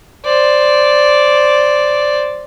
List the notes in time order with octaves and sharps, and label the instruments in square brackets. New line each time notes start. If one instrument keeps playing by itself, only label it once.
[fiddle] C5 D5